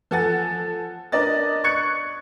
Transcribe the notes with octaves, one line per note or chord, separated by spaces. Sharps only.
F3 A4 F#5 G#5 A6
D4 A#4 D5 D#5 A6
C#6 F#6 G#6 C#7